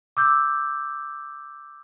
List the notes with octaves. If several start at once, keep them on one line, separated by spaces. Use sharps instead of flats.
D6 E6 G6